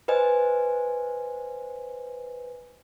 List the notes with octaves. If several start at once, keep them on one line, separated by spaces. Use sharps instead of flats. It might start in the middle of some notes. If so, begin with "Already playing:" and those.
B4 C5 D#5 G#5